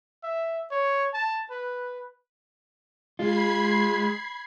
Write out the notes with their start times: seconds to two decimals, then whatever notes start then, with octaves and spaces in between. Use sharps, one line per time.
0.24 E5
0.71 C#5
1.14 A5
1.51 B4
3.19 G#3 F4 B5 G#6 C7